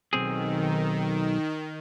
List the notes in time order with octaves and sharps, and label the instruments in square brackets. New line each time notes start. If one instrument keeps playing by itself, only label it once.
[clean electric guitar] B1 C4 G#4 [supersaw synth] D#3